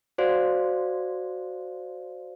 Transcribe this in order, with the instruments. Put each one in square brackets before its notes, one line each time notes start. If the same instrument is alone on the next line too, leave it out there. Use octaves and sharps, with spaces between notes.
[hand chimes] F#4 C5 D5 F5